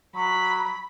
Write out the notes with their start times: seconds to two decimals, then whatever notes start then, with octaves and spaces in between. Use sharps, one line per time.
0.15 F#3 B5